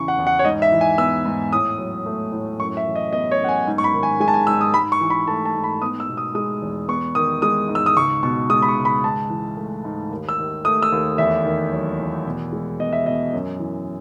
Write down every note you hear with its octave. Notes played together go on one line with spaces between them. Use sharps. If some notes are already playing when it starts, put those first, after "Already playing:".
Already playing: E2 C#3 E3 C#6
F#5
E2
F#5
C#5
G#2 D#5
E5
E3
G#5
B3 E6
G#2
A2 D#6
F#3
A3
A2
F#2 C#6
E5
E3
D#5
B3 D#5
C#5
F#2 F#5
G#5
G#2
C#6
B5
D#3
G#5
G#3 G#5
A5
G#5
G#2 E6
D#6
G#2 B5
C#6
E3
B5
A3 A5
A5
G#2
B5
B3 D#6
E6
B2
D#6
G#3 D#6
E2
B3 C#6
D#3 D#6
G#3 D#6
G#2
E6
D#6
C#2 C#6
B2 C#6
G#3 D#6
B5
C#6
C#2
B5
G#2 A5
E3
A3
G#2
D#2
E6
D#3
A3 D#6
E6
D#2
E2 E5
D#3
F#3
E2
B2
G#3
B3 D#5
E5
B2 D#5
F#2
E3